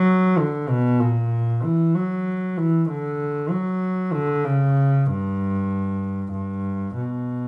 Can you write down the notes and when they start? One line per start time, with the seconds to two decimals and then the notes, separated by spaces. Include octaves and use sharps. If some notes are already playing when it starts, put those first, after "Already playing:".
Already playing: F#3
0.39 D3
0.69 B2
1.00 A#2
1.64 E3
1.95 F#3
2.57 E3
2.89 D3
3.50 F#3
4.13 D3
4.44 C#3
5.07 G2
6.32 G2
6.95 B2